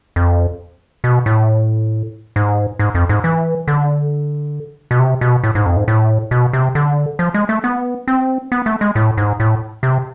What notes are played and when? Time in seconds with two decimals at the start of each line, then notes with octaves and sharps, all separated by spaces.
0.16 F2
1.04 B2
1.26 A2
2.36 G#2
2.79 G#2
2.95 F2
3.09 G#2
3.24 E3
3.68 D3
4.91 B2
4.99 C3
5.21 B2
5.44 A2
5.55 G#2
5.66 F2
5.77 G#2
5.88 A2
6.31 B2
6.53 C3
6.75 D3
7.19 F3
7.34 G#3
7.49 A3
7.64 B3
8.08 C4
8.52 B3
8.66 A3
8.81 G#3
8.96 A2
9.17 G#2
9.40 A2
9.83 C3